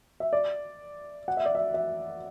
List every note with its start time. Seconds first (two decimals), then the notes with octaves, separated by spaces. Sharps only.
0.20 E5
0.33 D5
1.28 F#5
1.37 E5
1.46 D5
1.55 E5
1.74 E5